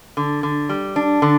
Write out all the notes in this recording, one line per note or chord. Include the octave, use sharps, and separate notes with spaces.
D3
D3
G3
D4
D3